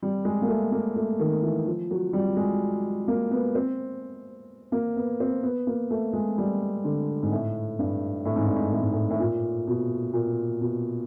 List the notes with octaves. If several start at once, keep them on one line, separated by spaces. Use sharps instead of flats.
G3
G#3
A#3
A3
A#3
A3
D#3
E3
F3
F#3
G3
G#3
A#3
B3
C4
A#3
B3
C4
B3
A#3
A3
G#3
G3
D3
G#2
A2
G2
A2
G#2
G2
G#2
A2
G#2
A2
A2
A#2
B2
A#2
B2